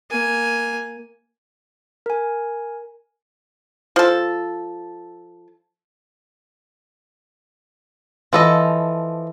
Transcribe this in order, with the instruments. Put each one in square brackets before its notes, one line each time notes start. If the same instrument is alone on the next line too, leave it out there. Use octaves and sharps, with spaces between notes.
[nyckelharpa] A#3 G#5
[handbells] A#4 G#5
[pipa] F3 A4
[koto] E3 [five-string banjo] F3 A4 D#5